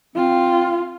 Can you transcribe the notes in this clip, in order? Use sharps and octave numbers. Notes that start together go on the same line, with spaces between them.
C4 F4